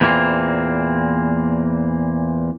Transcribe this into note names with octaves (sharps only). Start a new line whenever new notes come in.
E2 A#2 E3 G3 A#3 C4